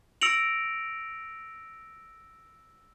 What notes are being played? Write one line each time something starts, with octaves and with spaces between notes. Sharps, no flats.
E6 A#6 C#7 D7 F7 F#7